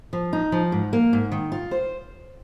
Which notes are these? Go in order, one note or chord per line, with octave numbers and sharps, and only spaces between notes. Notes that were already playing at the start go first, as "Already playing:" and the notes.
F3
D#4
F3
G#2
A#3
G#2
D#3
F4
C5